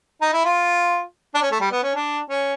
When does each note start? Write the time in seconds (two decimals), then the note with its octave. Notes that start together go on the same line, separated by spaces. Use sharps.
0.21 D#4
0.33 E4
0.45 F4
1.34 D4
1.42 C#4
1.51 A3
1.61 G3
1.71 B3
1.83 C#4
1.95 D4
2.29 C#4